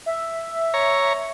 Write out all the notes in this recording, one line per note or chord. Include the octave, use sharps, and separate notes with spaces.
E5
C#5 A#5